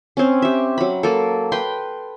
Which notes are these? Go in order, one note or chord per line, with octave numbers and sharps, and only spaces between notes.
C4 C#4
G4 E5
F#3 B5
A#3 A4
B4 G5 C6